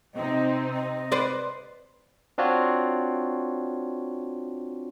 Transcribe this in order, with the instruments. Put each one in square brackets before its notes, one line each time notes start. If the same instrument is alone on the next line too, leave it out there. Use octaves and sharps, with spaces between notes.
[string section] C3 C4 D#4 [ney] D#5
[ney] D#5
[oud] B4 C5 D5
[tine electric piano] C4 D4 F4 F#4 C#5